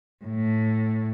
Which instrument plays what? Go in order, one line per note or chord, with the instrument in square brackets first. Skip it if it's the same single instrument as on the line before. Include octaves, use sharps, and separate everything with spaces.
[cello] A2